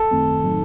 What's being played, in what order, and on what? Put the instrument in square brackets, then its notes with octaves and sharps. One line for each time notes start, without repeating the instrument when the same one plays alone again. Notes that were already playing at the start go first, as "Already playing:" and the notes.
Already playing: [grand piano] A4
[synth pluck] F#2 D#3 A3 C4
A2 F#3 C4 D#4